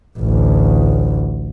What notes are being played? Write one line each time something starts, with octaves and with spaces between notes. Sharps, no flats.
A1 D2